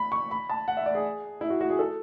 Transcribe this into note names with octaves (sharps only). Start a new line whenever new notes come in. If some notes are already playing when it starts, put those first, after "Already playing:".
Already playing: B5
C#6
B5
A5
F#5
E5
D5
G#4
E4
F#4
F#4
G#4
A4